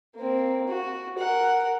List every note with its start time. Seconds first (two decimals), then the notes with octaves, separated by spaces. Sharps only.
0.17 A#3 C4
0.68 F#4
1.19 A#4 F#5